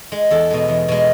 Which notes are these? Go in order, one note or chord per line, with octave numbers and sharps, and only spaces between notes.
G#3
E2 A4
B2 G#3
E2
B2 G#3